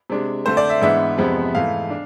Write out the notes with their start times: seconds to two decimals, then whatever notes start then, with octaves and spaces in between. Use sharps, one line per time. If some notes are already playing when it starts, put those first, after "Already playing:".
0.10 C3 G#3 D4
0.45 D3 A3 C4 C5
0.57 D5
0.69 E5
0.81 G#2 E3 G#3 B3 D4 E5
1.18 F2 C3 F3 G#3 B3
1.55 G#2 E3 A3 F5
1.90 D4